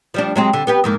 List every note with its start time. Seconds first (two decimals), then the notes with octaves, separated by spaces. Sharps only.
0.14 F3 G3 D4
0.36 F#3 G#3 C4
0.53 D3 G3
0.67 B3 G4 B4
0.84 F2 G#2 A#3